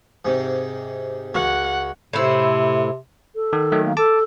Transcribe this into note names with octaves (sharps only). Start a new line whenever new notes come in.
G#2 C3
C#2 F#4 F#5
A2 C3 E4 C5
A4
D#3
D#3 F#3 A3
A#3
A4 A5 D6